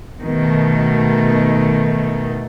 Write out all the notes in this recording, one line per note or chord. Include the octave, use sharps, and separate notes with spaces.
B2 D#3 A3